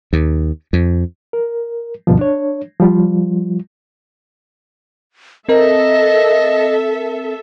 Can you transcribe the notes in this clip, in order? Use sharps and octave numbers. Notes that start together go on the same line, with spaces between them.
D#2
F2
A#4
D2 G2 B2 F3
D4 C#5
F3 G3 F4
C4 A4 A#4 D#5 E5